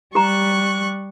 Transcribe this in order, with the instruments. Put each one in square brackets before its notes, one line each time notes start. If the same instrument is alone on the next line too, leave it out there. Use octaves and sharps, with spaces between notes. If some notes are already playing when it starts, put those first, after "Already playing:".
[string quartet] G3 C#6 F#6 [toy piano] G4 A#5